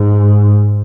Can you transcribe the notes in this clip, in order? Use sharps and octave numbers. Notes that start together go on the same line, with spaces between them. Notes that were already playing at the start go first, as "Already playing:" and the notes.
Already playing: G#2